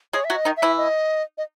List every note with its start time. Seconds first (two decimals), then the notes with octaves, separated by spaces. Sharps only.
0.13 G#3 G#4 C#5
0.25 E5
0.30 F#3 F#4
0.36 D#5
0.45 D#3 D#4
0.57 E5
0.62 E3 E4
0.78 D#5
1.38 D#5